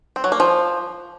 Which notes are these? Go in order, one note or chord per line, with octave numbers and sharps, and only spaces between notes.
C4
F#3
A#3
F3